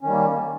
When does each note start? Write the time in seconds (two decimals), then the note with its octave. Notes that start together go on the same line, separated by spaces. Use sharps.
0.01 C#4
0.04 D#3
0.08 G3
0.11 A#3